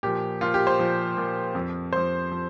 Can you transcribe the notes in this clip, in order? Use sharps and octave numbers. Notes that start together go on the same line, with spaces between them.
A#2 F3 G4
A#2 F3 F4
G4
C5
A#2 F3
A#2 F3
F2 F3
F2 F3 C5
F3